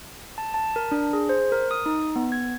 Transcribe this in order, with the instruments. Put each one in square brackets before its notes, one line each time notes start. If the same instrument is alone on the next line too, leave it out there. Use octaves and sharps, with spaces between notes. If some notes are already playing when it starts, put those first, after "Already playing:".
[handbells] A5
A5
A#4
D4
G#4
C5
A#4
D#6
D#4
B3
G#6